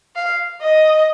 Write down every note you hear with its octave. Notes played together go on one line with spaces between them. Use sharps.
F5
D#5